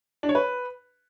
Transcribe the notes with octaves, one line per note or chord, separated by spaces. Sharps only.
D4
C#5
B4